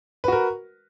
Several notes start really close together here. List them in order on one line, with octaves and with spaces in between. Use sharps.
B4 F#4 A#4